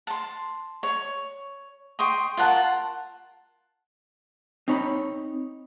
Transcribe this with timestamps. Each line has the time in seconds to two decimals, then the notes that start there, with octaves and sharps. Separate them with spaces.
0.07 A5 C6
0.83 C#5
1.99 G5 C6 C#6 D#6
2.37 F4 A#4 F#5 A5
4.68 C4 D#4 C#5 B5